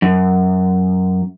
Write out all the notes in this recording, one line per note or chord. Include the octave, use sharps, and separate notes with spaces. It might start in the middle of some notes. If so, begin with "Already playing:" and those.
F#2